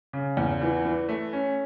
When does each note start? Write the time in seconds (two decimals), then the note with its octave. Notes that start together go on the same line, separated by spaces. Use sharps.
0.13 C#3
0.37 E2
0.61 E3
0.85 E3
1.09 A3
1.33 C#4